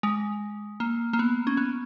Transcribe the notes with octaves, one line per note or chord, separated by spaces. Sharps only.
G#3
A#3
A#3
B3
C#4
B3